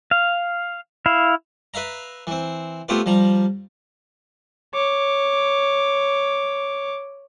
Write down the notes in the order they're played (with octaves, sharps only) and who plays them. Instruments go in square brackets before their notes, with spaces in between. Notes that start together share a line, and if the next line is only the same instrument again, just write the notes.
[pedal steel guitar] F5
E4 F5
[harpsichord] B4 E5 F5 A#5
E3 C4
A3 B3 C4 F4 G4 B4
F3 G3 A#5
[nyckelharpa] C#5 D6